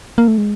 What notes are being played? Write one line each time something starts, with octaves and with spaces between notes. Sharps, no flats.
A#3
A3
G#3